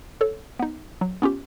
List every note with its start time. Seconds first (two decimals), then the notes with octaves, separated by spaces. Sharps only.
0.21 A4 C#5
0.59 B3 D#4
1.01 F#3
1.22 B3 C#4 F4 G4